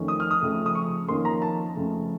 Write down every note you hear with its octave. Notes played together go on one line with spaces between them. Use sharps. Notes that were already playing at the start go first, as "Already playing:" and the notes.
Already playing: F2 D#3 A3 C#4
D#6
F6
D#6
F2 C#3 A3
D#6
C#6
F2 D#3 A#3 C#4 C6
A#5
A5
F2 C#3 A3